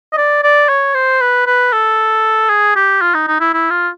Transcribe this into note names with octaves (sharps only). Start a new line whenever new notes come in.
D#5
D5
D5
C#5
C5
B4
B4
A4
G#4
G4
F4
D#4
D#4
E4
E4
F4